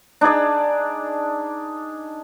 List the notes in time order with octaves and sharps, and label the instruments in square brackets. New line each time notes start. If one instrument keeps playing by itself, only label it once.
[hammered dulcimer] D4 D#4 G#4 D5